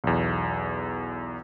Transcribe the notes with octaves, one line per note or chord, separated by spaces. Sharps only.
B1 E2